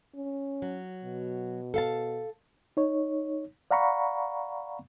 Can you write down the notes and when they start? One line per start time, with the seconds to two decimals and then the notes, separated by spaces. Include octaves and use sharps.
0.15 C#4
0.62 F#3
1.04 B2
1.74 A4 F5 A5
2.77 D#4 C#5
3.71 D5 F5 F#5 A#5 B5 C#6